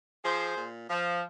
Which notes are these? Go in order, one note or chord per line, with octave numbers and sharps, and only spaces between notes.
F3 G#4 C5
A#2
F3